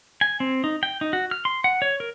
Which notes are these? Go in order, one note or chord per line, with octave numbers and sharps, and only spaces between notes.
G#5
C4
D#4
G5
D#4
F#4
F6
C6
F#5
C#5
A#4